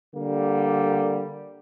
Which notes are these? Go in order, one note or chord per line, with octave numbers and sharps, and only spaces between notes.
D3 G3 A#3